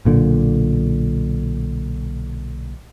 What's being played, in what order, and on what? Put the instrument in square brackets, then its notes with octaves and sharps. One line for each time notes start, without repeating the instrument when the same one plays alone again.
[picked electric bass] B1 A#2 D3